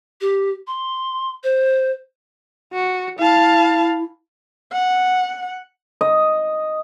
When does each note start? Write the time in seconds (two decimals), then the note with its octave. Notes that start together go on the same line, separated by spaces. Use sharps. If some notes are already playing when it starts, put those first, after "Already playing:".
0.21 G4
0.67 C6
1.44 C5
2.73 F#4
3.19 E4 F5 A5
4.72 F#5
6.01 D#5